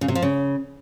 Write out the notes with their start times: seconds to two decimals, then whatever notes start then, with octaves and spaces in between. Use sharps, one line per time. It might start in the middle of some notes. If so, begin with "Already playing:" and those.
0.01 C#3
0.08 C3
0.15 F3
0.22 C#3